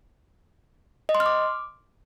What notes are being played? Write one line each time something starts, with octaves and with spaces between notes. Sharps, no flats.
D#5
C6
F6
D6